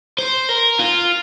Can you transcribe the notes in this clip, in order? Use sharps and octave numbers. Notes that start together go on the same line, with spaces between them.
C5
A#4
F4